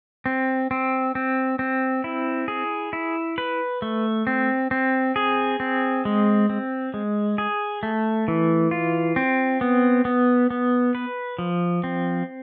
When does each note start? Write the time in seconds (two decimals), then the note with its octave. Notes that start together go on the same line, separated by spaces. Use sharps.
0.26 C4
0.71 C4
1.15 C4
1.59 C4
2.04 E4
2.48 G#4
2.93 E4
3.38 B4
3.82 A3
4.27 C4
4.71 C4
5.16 G#4
5.60 C4
6.05 G#3
6.49 C4
6.94 G#3
7.38 G#4
7.83 A3
8.28 E3
8.71 F4
9.16 C4
9.61 B3
10.05 B3
10.50 B3
10.95 B4
11.39 F3
11.84 C4